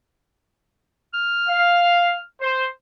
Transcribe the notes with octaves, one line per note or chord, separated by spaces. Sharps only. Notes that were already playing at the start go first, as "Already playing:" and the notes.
F6
F5
C5